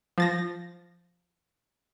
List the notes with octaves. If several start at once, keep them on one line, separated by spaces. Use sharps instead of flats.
F3 A6 A#6